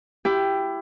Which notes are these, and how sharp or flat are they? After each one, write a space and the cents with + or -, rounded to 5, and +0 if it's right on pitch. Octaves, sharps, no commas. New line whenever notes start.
E4 +20 G4 +0